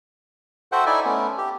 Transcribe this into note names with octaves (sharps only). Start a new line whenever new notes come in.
F#4 A4 C5 E5 F#5 G5
D#4 E4 A4 D5 E5 G#5
A3 B3 C#4
G4